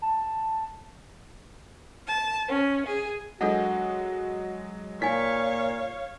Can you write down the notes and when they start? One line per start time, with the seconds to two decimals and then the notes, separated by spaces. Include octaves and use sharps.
0.02 A5
2.07 A5
2.48 C#4
2.86 G#4
3.41 F#3 G#3 D4 F#4 A4 D#5 F#5
5.02 A#2 D#4 C#5 F5 G#5 B6